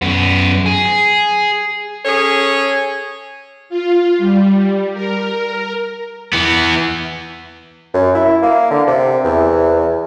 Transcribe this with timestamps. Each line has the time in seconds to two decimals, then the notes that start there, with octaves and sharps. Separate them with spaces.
0.02 F#2 B3
0.66 G#4
2.05 C#4 G#4 A4 C#5
3.69 F4
4.18 G3
4.94 A#4
6.33 E3 B3
7.94 F#2
8.14 E4
8.42 A#3
8.71 D3
8.87 C3
9.24 E2